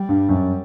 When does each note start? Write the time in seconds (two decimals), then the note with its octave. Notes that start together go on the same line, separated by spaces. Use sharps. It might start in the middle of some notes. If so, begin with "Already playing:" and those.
Already playing: G3
0.09 G2
0.29 F#2